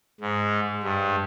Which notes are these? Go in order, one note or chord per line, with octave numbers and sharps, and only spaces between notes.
G#2
G2